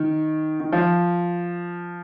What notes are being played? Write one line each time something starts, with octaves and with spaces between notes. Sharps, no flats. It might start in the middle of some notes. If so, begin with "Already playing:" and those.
Already playing: D#3
D#3
F3